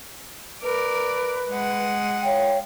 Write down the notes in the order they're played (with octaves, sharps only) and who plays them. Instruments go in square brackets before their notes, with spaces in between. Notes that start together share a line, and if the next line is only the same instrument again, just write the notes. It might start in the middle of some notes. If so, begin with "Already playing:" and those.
[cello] A#4 D5 [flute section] B4
[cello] G#3 F#5
[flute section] C#5 F5 G5